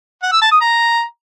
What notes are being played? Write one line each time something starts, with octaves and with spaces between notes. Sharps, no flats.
F#5
E6
A5
D#6
A#5